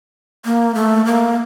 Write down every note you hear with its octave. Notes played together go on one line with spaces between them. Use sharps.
A#3
A3
A#3